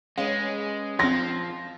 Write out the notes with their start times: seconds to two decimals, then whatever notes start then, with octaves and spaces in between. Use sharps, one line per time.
0.18 G#3 C#4 G#4 B4 F5
0.99 B1 F3 C4 F5 C6 A#6